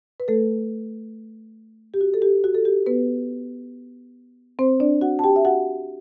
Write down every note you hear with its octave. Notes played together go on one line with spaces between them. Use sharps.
B4
A3 A4
G4
F#4
A4
G4
F#4
A4
G4
B3 B4
C4 C5
D4 D5
F#4 F#5
A5
G4 G5
E5
F#4 F#5